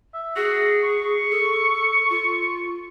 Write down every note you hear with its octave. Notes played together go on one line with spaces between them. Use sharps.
E5
F#4 G#4
C#6
A4
F4